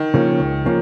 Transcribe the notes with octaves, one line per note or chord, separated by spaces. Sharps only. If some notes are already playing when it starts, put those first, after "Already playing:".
Already playing: D#3
C#3 F3 A#3 C#4
C#2
C#3 F3 A#3 C#4